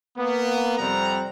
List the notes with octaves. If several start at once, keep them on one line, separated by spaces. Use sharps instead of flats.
A#3 B3
F2 C3 G3 C4 F#5 A#5